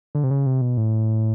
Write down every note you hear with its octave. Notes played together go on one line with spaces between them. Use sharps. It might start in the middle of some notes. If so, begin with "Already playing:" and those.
D3
C3
C#3
C3
B2
A2